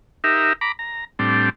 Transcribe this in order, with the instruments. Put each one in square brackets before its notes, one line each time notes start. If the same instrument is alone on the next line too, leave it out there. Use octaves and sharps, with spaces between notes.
[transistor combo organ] D#4 G4 A#4 E5
A#5 B5 D6
A#5
A2 G3 C4 D4